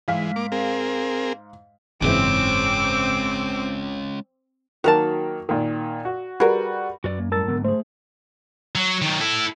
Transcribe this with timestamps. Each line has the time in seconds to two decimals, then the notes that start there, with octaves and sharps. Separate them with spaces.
0.08 G#2 E3 G#3 F5 B6
0.36 A#3 D6
0.52 C4 G#4 A#4
2.02 F#1 G#2 E3 G#3 C4 C#4 D6 E6
4.84 D#3 F#3 A#3 F#4 A#4 A5
5.49 A#2 D#3
6.05 F#4
6.40 G3 F#4 G#4 A#4 B4
7.04 F#2 F#4 B4 D5
7.19 A#3
7.32 A2 G3 A#4 A5 E6 A6
7.48 G#2 D3 F#3 B3
7.64 A3 G#4 C5
8.75 F#3
9.02 D#3 F#3
9.21 E4 A4